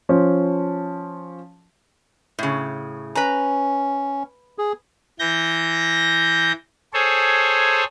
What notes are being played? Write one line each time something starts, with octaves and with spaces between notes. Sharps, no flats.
F3 C#4
A2 C#3
C#4 B4 A#5
G#4
E3 G6 A#6
G#4 A4 C5 C#5